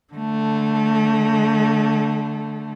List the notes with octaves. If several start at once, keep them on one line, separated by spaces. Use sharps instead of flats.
D3 A3